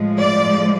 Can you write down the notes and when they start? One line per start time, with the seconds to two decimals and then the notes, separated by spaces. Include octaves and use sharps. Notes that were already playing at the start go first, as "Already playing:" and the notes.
Already playing: A2 F3 G#3
0.19 D5